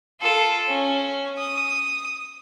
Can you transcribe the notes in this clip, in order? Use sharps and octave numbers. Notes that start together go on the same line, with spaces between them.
F4 A4
C#4
D#6